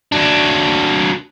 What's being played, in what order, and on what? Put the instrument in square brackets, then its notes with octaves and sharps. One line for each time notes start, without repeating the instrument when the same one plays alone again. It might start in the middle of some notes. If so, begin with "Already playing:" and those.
[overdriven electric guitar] F#3 D4